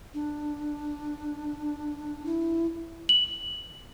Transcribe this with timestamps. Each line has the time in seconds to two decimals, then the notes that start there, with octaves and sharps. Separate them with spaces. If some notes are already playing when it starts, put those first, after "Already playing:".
0.14 D4
2.26 E4
3.09 F#7